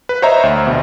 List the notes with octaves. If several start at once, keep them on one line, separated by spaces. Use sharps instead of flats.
B4
C5 C#5 D#5 E5 A#5
D2
A#1 B2